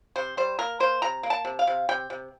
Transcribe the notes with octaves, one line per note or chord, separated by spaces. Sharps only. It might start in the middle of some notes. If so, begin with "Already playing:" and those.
C3 C5
G3 C5
A#3 A#4
A#3 C5
C3 A#5
A#3
A5
C3
F5
C3
C3 G5
C3